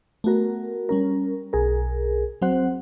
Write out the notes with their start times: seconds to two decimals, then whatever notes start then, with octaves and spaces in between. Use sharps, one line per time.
0.24 A3 B3 F#4 A#4
0.89 G3 C#4 A#4
1.53 B1 G#4 A#4
2.42 F#3 C4 C5 F#5